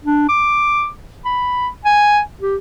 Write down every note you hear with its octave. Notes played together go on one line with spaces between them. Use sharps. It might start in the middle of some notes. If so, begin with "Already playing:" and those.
D4
D6
B5
G#5
G4